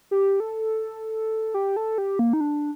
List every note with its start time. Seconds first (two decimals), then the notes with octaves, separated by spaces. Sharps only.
0.11 G4
0.40 A4
1.54 G4
1.76 A4
1.98 G4
2.19 A#3
2.33 D#4
2.41 D4